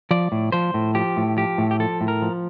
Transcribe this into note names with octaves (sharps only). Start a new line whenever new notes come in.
F3 D5
A2
F3 C5
A2
F3 G4
A2
F3 G4
A2
G4
F3 A4
A2
A#4
F3